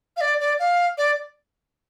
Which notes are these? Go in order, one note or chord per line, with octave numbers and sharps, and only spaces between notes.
F5
D5
D5
F5
D5